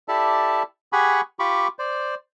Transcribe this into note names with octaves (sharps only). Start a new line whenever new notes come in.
E4 G4 A4 D5 E5 A5
G4 G#4 F#5 G#5 B5 C#6
F4 G4 B5 C#6 D6
C5 D5